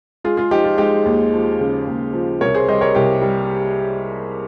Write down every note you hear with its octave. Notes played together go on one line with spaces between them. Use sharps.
G#3 F4 G#4
F4 G#4
F3 D#4 G4
F4
G#3 D#4 G4
D#2
F3
C#3
D#2
F3
C2 A#4 C#5
G#4 C5
G3 C5 D#5
A#4 C#5
C2 G4 A#4
G3